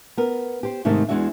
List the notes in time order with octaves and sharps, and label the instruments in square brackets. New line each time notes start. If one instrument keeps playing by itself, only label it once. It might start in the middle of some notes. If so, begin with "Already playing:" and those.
[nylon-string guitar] B3 A#4
G4 C5
G#2 C3 D#3 A3 D#4
E2 E3 G#3 D4 F#4 E5